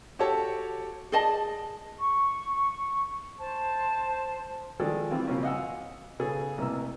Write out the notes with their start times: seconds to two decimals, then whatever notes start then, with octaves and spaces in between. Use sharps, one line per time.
0.19 F#4 G4 A4 C#5 A5
1.12 G#4 D5 D#5 A5
2.00 C#6
3.38 C5 A5
4.80 D#3 F3 G#3 G#4 A4 D5
5.11 E3 G3 C4 F4
5.28 C#3 F3 F#3 A#3 C4 C#4
5.43 D#5 F5 F#5 G#5 E6
6.19 C#3 B3 G#4 A4
6.58 A1 C3 A#3 B4 E6